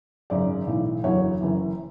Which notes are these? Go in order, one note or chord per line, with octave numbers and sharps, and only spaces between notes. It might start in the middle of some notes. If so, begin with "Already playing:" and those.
G#1 F#2 C#3 D5
B1 A2 E3
F#1 E2 D3 F#3 C#5
F#1 F#2 E3